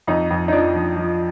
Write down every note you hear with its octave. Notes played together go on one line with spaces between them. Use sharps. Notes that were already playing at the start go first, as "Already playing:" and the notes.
F2 D#4
F2
D#4
F3 D4
F3
F3